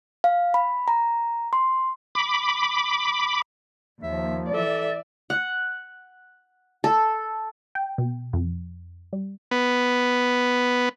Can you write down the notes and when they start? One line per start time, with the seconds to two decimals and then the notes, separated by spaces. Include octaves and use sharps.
0.24 F5
0.54 B5
0.88 A#5
1.53 C6
2.15 B5 D6
4.03 D#2 F3 E5
4.53 E3 A4 D5 E5
5.30 F#5
6.84 A4
7.75 G5
7.98 B2
8.33 F2
9.13 G3
9.51 B3